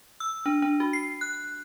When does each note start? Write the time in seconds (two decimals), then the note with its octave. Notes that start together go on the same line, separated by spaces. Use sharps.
0.20 E6
0.46 D4
0.62 D4
0.80 F#4
0.93 C7
1.21 F#6